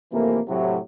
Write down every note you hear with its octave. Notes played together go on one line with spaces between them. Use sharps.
F2 C3 E3 A3 A#3
A2 C3 F#3